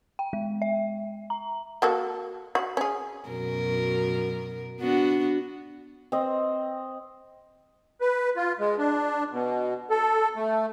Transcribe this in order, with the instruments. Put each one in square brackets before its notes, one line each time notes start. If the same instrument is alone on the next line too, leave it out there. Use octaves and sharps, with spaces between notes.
[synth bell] G5
G#3
E5
A#5
[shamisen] A#3 F#4 A4
F#4
C#4 G#4
[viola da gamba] F#2 B2 A#4
B3 D4 F#4
[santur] C4 D#5
[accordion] B4
F4
G#3
D4
B2
A4
A3